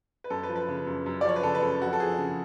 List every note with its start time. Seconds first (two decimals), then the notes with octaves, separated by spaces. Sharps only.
0.24 B4
0.30 F#2 A4
0.43 B4
0.49 F3
0.56 B4
0.68 C#3
0.87 F#2
1.06 F#2
1.21 D5
1.25 F3 C#5
1.36 B4
1.43 C#3 A4
1.55 B4
1.62 F#2 A4
1.81 F2 F#4
1.93 A4
2.00 F3 G#4
2.19 C#3